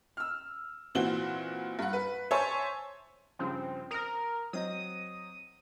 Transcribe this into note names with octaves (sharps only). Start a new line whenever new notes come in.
E6 F6
A#2 E3 C4 F#4 G7
G2 F#5
B4
C5 C#5 E5 G#5 A5 C6
G2 C#3 F3 C4
A#4 D#6 F6
F#3 C4 D#5 D#6